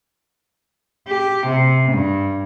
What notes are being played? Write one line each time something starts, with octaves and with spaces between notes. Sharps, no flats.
G4
C3
G2